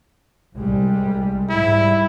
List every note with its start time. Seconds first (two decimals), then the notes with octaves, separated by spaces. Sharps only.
0.55 C2 G3 G#3
1.50 G#2 G3 E4